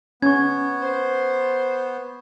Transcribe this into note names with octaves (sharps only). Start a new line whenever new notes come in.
B3 C#4 C#6 G#6
C5